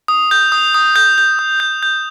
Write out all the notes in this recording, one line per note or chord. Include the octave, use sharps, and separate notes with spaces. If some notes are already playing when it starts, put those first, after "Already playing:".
D#6
G6
D#6
D#6
G6
G6
D#6
G6
G6